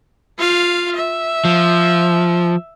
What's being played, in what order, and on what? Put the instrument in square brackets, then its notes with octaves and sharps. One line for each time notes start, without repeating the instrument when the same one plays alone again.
[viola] F4 F5
E5
[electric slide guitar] F3